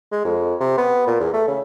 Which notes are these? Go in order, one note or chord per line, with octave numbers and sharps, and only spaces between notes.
G#3
F2
C3
B3
A#2
E2
A3
C#3